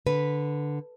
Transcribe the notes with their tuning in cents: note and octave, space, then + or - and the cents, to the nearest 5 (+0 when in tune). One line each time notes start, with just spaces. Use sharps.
D3 +0 B4 +0